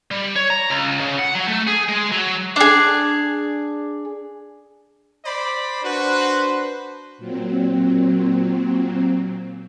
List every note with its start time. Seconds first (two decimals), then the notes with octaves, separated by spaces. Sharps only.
0.11 G3
0.36 C#5
0.50 A#5
0.70 C#2
1.00 C#3
1.18 F#5
1.35 F#3
1.48 A3
1.67 G#4
1.88 G#3
2.11 F#3
2.56 D4 G#4
5.25 C5 D5 B5
5.84 D4 F#4 B4 C5
7.18 A#2 F#3 C4